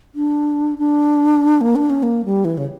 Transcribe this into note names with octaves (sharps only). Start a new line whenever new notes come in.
D4
D4
A#3
D4
C#4
A#3
G3
E3
C#3